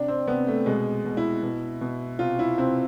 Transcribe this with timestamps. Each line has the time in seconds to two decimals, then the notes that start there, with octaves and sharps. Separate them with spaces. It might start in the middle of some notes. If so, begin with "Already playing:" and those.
Already playing: C3 D4
0.08 C4
0.27 C3 B3
0.47 A3
0.66 B2 G#3
1.05 B2
1.17 E4
1.43 B2
1.81 B2
2.19 C3 F4
2.39 E4
2.58 C3 C4